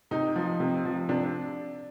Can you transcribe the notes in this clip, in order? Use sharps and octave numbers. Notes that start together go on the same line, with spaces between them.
C3 D#4
F3
C3
F3
C3 D4